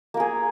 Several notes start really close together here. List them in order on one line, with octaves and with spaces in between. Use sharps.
A#3 A#4 G#4